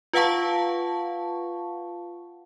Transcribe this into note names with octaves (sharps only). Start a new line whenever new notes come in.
F4 B4 F5 F#5 A5 C#6